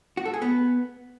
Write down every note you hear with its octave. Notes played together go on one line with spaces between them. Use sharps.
F#4
A4
G#4
B3